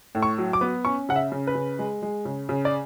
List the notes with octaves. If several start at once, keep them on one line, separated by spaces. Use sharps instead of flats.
A2
C#6
F#3
D6
B3
C#4 C#6
C#3 F#5
E5
C#3
B4
C#3
G#3
G#3
C#3
C#3
D5